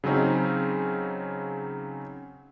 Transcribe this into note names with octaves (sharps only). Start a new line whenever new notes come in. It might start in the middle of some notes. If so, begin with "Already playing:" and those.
C#3 F#3 C4 C#4 D#4